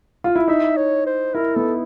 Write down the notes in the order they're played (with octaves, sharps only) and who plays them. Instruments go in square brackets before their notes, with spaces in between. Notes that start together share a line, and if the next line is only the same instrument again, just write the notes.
[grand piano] F4
E4
[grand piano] D#4 [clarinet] E5
[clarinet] C#5
C5
[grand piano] E4 [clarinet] A#4
[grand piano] B3 [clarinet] A4